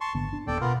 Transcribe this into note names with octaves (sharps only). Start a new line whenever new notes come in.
A5 C6 C#6
G#1 D3 B3 A5
D4
D#1 B3 A4 D5 G5
B2 B3 F4 A#4